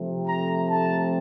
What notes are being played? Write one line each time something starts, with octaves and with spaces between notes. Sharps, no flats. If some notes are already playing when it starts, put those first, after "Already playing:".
Already playing: C3 F3 A3
A#5
A5